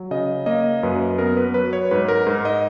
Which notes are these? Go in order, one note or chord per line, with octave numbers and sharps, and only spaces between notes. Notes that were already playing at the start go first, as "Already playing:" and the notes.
Already playing: F#3
C#3 D#5
A#3 D#5
F#2 B4
B3 A#4
B4
F#3 B4
C#5
G#2 B4
A#4
G#2
D#5